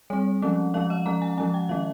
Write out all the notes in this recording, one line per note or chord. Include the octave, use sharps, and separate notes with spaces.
G3 C4 C#5
F3 G#3 C#4
F3 G#3 C#4 F5
D#5
F3 G#3 C#4 A#5
G#5
F3 G#3 C#4 G#5
G5
D#3 G#3 C#4 F5